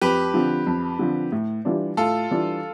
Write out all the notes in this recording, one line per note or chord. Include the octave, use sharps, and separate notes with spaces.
F2 G4 B4
D3 F3 C4
F2
D3 F3 C4
A2
E3 G3 D4 F4
A2 F4 A4
E3 G3 D4 F4